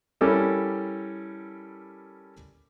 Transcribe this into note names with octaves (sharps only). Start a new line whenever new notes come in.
G3 C#4 E4 G4 A4 A#4